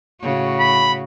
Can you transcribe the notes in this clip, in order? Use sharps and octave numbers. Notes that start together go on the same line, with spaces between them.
A2 C#3 F#4
B5